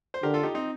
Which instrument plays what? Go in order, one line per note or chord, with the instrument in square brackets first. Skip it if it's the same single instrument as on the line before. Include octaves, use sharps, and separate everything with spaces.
[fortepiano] C5
[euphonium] D3 [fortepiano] G4 A#4
[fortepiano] F4 A4
D#4 G4
C4 D#4